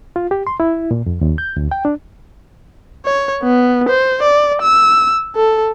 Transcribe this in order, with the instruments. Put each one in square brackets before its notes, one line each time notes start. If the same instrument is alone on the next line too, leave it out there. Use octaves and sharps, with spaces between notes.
[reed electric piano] F4
G4
C6
E4
A#2
F2
D#2
G6
D2
G5
D4
[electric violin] C#5
B3
C5
D5
E6
A4